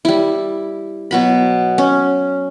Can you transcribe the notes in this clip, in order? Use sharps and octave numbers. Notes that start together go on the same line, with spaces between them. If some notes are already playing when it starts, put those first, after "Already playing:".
G3 E4
B2 F#3 B5
C#4